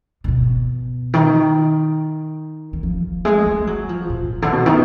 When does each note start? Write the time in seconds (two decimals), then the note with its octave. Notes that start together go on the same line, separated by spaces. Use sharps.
0.24 D3
0.28 B2
1.14 D#3
2.73 D#3
2.83 F3
3.25 G#3
3.46 G#3
3.67 F#3
3.89 F3
4.10 A#2
4.42 D3
4.52 B2
4.66 D#3